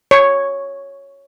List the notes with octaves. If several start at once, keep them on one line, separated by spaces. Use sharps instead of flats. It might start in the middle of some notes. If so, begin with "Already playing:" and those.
C#5